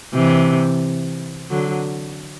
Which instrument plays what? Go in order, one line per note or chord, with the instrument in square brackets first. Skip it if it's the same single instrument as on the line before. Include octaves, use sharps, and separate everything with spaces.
[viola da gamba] C3 E3
D3 F#3